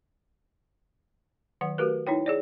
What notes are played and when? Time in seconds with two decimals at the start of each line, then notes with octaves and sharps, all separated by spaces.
1.61 D#3 F#3 F#5
1.78 A3 F#4 G4 A#4 B4
2.07 D#4 E4 C#5 G5
2.26 G#4 C#5 D5